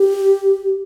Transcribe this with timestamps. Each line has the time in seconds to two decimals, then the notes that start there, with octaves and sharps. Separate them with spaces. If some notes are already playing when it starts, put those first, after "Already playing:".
Already playing: G4